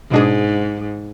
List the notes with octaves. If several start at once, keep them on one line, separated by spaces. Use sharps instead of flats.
G#2 B2 G#3 D4 G#4